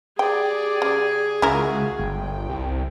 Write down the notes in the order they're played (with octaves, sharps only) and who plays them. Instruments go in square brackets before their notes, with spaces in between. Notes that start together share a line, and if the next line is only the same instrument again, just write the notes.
[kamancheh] G4 D5 [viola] G#4 [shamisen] G5
[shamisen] C#3
[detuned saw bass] C#2 [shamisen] C#4 E4 A#4 [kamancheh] F#4 F5
[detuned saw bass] G1 [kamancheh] G5
[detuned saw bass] C2